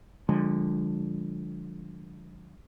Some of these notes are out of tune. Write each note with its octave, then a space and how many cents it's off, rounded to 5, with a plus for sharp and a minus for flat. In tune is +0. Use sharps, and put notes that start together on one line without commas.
D3 +0 F3 +15 G#3 -30